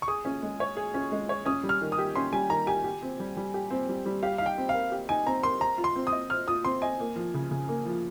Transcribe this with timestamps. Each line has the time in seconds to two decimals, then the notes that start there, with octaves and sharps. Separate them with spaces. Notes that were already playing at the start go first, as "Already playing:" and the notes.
0.02 C#6
0.08 G#4 D#6
0.25 C#4
0.42 G#3
0.60 C#5
0.77 G#4
0.94 C#4
1.12 G#3
1.29 C#5
1.46 C#4 D#6
1.63 G3
1.69 F6
1.81 D#3
1.92 D#6
1.98 G4
2.15 C#4 C6
2.32 G3 G#5
2.50 D#3 A#5
2.67 G4 G#5
2.84 G4
3.02 C4
3.20 G3
3.37 G3
3.54 G4
3.70 C4
3.89 G3
4.06 G3
4.23 G4 F5
4.38 D#4 F5
4.46 G5
4.57 C4
4.69 F5
4.74 A#4
4.92 G4
5.09 D#4 G#5
5.26 C4 A#5
5.43 A#4 C6
5.60 C5 A#5
5.78 F4
5.84 C6
5.96 C4
6.07 D#6
6.12 D#5
6.30 C5 F6
6.48 F4 D#6
6.65 C4 C6
6.82 D#5 G#5
7.00 A#3
7.16 F3
7.34 C#3
7.51 C#3
7.68 A#3
7.86 F3